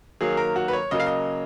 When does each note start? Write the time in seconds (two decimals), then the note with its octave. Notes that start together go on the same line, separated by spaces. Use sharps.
0.21 D#3 F#3 A#3 G#4
0.37 A#4
0.56 F#4
0.68 B4
0.73 C#5
0.91 C#3 F#3 A#3 D#5
1.00 F5
1.06 D#5